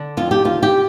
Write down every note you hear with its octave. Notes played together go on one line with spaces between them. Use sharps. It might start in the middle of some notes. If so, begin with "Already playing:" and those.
Already playing: D3
F2 F4
G4
D#2 F4
G4